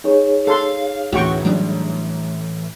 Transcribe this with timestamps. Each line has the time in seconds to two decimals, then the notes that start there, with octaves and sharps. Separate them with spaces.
0.04 D#4 G#4 C#5
0.47 A4 F5 C6
1.12 A1 D2 A2 E3 F#4 G5 C#6
1.45 F#3 G3 D4